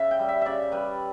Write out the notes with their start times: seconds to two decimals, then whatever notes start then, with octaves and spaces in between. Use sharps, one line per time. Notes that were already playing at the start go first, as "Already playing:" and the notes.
Already playing: C#3 E5
0.11 G5
0.19 G3
0.28 E5
0.41 C#3 D5 E5
0.72 G3 B4